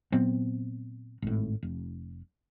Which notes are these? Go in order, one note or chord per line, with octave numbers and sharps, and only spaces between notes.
A#2 F#3 B3 C4
G#1 A2
F1